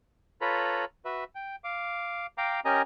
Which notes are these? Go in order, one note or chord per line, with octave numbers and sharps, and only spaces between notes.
F4 A4 B4 C#5 A#5 B5
F#4 B4 E5
G5
F5 D6
F5 G5 A#5 D6
C#4 G4 A#4 D#5 G#5 A#5